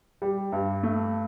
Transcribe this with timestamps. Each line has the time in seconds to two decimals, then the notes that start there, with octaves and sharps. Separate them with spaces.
0.22 G3
0.52 G2
0.83 A3